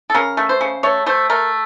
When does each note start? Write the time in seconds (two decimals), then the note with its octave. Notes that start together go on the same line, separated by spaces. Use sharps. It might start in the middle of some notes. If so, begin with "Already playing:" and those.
0.10 A4
0.14 C#3 A#4
0.37 A3
0.49 C5
0.61 C#3
0.83 A3 C#5
1.06 A3 C5
1.30 A3 A#4